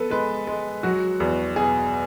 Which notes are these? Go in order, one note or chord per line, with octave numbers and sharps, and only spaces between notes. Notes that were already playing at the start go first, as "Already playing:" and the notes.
Already playing: B3 A4 B4
G#3 B4
G#3
F#3 F#4
E2
B2 G#4